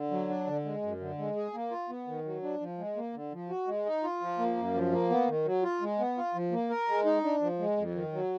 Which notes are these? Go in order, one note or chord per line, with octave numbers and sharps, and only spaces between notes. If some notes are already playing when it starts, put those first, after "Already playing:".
Already playing: D3
F#3
D4
D3
G#3
F#2
D3
G#3
G#4
A#3
F4
B3
D#3
F#3
D4
F3
G#3
A#3
D3
F3
F#4
G#3
D#4
F4
F3
A#3
F#2
F3
A#3
B3
D#3
F#3
F4
G#3
B3
F4
F3
A#3
A#4
G#3
D#4
D4
F3
G#3
F2
D#3
F#3